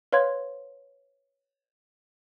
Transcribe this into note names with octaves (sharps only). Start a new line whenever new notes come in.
B4 C#5 F5 C6 G#6